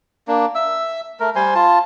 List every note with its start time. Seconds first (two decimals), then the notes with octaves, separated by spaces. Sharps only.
0.28 A#3 D4
0.55 E5 E6
1.20 A3 A#4
1.35 G3 C5 G#5 C6
1.55 F4 A5